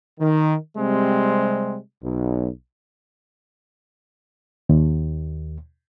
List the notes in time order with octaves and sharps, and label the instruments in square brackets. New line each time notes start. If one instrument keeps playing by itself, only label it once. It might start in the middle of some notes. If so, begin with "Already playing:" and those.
[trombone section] D#3
C3 G3 G#3 C4
B1
[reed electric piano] D#2